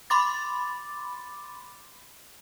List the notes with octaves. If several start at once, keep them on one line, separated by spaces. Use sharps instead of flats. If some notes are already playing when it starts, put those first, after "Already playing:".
B5 C6 D6 A6